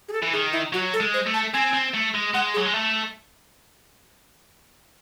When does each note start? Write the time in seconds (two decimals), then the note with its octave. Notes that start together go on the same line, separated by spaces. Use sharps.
0.08 G#4
0.13 A4
0.23 E3
0.33 D#3 G#4
0.53 E4
0.73 F#3 F#4
0.93 A4
1.00 G#3
1.14 C5
1.26 A3
1.34 A5
1.54 C4 G#5
1.74 C4
1.94 A3
2.14 G#3
2.34 G#3 F#5
2.54 G#4
2.57 F#3
2.65 G#3
2.74 A3